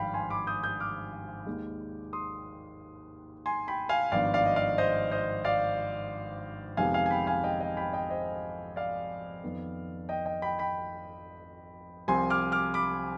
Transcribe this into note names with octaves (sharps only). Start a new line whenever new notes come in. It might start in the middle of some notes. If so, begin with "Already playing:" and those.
Already playing: G#1 G2 F3 F5 G5 B5
G#5 C6
B5 D6
D#6 G6
D#6 G6
D6 F6
D#2 D#3 G#3
C6 D#6
G#5 C6
G5 B5
F5 G#5
G#1 G2 F3 B3 D5 F5
D5 F5
D#5
D5 F5
C5 D#5
C5 D#5
D5 F5
F2 C3 D#3 G#3 B3 F5 G#5
F5 G#5
G#5
G5 B5
F5 G#5
D#5 G5
D#5 G5
G5 B5
D#5 G5
C5 D#5
D5 F5
F2 D#3 B3
D#5 G5
D#5 G5
G5 B5
G5 B5
C2 C3 F3 C4 G#5 C6
D6 F6
D6 F6
B5 D6